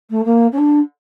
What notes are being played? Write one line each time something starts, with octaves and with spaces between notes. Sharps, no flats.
A3
A#3
C#4
D4